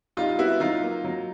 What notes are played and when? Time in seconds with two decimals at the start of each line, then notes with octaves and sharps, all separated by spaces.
0.17 G3 D#4 F4
0.38 B3 E4 F#4
0.60 F#3 D#4 F4
0.82 A#3
1.04 F#3